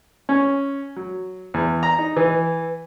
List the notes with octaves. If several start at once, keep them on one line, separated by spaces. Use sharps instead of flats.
C#4
F#3
E2
A#5
D#4
E3